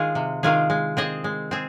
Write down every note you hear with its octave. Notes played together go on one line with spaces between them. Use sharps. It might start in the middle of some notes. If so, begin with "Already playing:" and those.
Already playing: D#3 G#3 F4 G#4
C3
D#3 G#3 F4 G#4
G#3
C4 G#4 D#5
G#3
C4 G#4